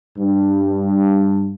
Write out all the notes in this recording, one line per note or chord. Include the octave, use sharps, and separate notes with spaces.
G2